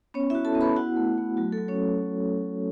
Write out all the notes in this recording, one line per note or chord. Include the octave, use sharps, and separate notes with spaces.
B3 C#4 C#5
E4 F#4 E5
A4 A5
B3
B4 B5
E4 F#4 F#5
A3
A3
F#3 F#4
A4
F#3
C#4 C#5